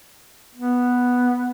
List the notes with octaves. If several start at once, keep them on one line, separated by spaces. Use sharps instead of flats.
B3